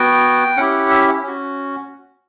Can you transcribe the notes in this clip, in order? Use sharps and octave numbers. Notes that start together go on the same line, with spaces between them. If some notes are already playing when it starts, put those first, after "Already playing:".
Already playing: B3 F#4 G5
C#4 E4 G4 F#5
E5
C#4 F#4